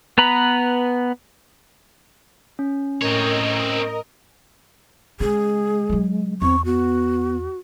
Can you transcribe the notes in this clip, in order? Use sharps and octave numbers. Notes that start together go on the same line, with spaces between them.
B3 B4 A#5 B5
C#4
A2 C4 A#4 C#5 D#5
C#3 G#3 G#4
C#3 F#3
E2 C4 C#6
B3 F#4